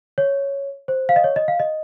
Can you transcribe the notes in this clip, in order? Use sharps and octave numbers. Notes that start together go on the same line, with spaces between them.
C#5
C5
F5
D#5
C#5
D#5
F5
D#5